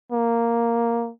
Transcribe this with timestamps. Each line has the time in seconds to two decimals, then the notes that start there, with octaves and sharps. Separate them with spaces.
0.12 A#3